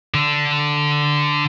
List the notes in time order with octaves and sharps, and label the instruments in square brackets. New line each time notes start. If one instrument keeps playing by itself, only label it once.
[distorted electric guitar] D3 D4